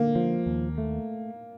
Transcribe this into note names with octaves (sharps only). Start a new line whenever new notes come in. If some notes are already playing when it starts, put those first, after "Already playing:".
Already playing: D3 A#3
F3
D#2
A3